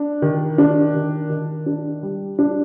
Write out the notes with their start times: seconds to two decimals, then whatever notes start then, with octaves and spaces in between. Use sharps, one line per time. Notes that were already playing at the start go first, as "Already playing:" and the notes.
Already playing: D4
0.22 D#3
0.58 D4
0.94 D#3
1.30 D#3
1.66 D4
2.03 G3
2.39 D4